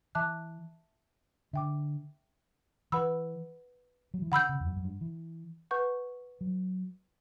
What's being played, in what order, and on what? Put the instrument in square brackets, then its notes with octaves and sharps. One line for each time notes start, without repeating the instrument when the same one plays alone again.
[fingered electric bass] E3 [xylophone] E5 A5 D6 F#6
[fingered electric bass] D3 [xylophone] E5 G5 D6
[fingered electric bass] E3 [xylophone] B4 F#5 B5 E6
[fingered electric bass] F#3
E3
[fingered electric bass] D3 [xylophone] F#5 B5 E6 G6
[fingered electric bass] C#3
E2
F#2
F#2
G2
E3
[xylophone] B4 F#5 C#6 G6
[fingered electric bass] F#3